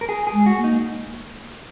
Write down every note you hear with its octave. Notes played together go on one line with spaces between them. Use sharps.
A#4
G#4
G#4
G#3
F#4
A#3
D#4